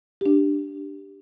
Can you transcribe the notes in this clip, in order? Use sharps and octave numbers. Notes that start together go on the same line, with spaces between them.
D4 G4